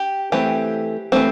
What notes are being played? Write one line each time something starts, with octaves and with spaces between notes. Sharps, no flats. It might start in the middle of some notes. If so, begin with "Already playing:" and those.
Already playing: G4
E3 A3 C4 G4
E3 A3 C4